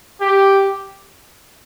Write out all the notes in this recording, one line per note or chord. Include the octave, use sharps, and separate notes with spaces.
G4